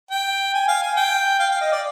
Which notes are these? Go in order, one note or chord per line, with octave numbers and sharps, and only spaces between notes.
G5
G#5
F5
G#5
G5
F5
F5
D#5
D5